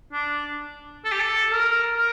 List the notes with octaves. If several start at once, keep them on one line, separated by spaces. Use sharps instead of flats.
D4
A4
G4
A4
A#4
A#4